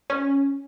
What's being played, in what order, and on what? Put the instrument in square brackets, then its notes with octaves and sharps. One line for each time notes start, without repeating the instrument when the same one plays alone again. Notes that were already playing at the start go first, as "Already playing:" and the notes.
[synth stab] C#4